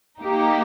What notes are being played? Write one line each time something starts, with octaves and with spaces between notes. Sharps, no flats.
A#3 D#4 G4